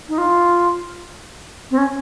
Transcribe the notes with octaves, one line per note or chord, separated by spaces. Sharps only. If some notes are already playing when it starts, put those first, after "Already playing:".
D#4
F4
C4
C#4